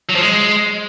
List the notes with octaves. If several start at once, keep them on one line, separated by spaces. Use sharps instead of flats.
F#3
F3
G#3